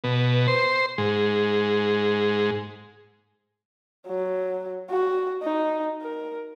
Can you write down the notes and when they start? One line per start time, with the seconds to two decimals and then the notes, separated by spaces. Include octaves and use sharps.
0.04 B2
0.48 C5
0.98 G#2
4.07 F#3
4.90 F#4
5.42 D#4
6.02 A#4